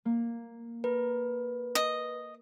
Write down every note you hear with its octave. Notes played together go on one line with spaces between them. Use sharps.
A#3
A#4 B4
D#5